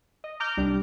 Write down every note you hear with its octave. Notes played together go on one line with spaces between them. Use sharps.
D#5
A#5 D6 F6 G6
C2 G3 D4